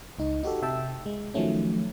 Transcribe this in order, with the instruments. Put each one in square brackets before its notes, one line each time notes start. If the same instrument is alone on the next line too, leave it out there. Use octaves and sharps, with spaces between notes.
[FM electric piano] C#2 D#4
D#4 F#4 G4 A4
C3 E5 G5 A5 E6
G#3
D#3 F3 F#3 A3 C#4